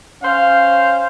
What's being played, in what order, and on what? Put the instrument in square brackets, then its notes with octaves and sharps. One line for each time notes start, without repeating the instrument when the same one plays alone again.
[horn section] C#4 C5 F5